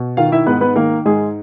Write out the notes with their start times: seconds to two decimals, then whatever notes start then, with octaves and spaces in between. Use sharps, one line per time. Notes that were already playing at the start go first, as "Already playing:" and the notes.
Already playing: B2
0.17 D#3 F4 F5
0.32 E4 E5
0.46 G#2 B3 B4
0.61 B3 B4
0.76 D#3 A#3 A#4
1.05 G#2 G#3 G#4